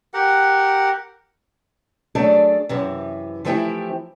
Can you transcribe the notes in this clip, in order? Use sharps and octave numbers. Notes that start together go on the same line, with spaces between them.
G4 A#4 F#5
F#3 A3 D4 G#4 A4 D5
F#2 C3 E3
E3 F3 A3 C4 E4 G4